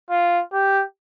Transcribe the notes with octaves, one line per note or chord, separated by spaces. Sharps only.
F4
G4